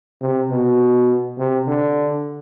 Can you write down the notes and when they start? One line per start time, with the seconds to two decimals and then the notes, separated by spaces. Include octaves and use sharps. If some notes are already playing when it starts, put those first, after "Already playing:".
0.21 C3
0.50 B2
1.38 C3
1.67 D3